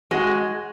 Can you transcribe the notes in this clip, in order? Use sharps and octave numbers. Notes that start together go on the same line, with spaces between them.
G#3 F#4